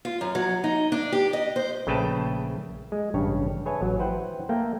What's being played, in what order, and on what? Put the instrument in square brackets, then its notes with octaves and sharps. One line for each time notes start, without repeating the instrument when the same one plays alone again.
[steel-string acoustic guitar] F4
F#2
F#3
D#4
D4
G4
D#5
C5
[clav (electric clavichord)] A#1 C#3 A3 B4 G5 A5
G#3
A1 G2 C#3 D4 C#5 G5
G#4 B4 C#5 E5 G#5 A5
A1 F#3
E4 B4 C5 F#5 G5
A3 A#3 G5